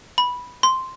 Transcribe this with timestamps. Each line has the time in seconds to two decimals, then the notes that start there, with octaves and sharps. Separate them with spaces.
0.18 B5
0.63 C6